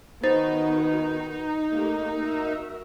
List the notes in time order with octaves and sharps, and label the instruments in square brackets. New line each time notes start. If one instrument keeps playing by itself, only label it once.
[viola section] D#3 B3 F#4 [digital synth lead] D#4 [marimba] C5 A6
[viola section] A3 A#3 G4
F#4 A#4 E5